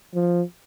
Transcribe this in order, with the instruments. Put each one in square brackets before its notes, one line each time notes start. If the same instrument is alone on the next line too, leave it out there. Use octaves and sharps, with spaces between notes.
[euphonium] F3